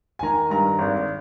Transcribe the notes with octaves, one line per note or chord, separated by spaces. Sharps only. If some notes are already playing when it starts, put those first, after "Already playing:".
G#5
D#3 A#5
G2 A#5
G#1